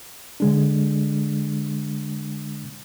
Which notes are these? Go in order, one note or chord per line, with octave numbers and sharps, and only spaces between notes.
D3 G#3 D4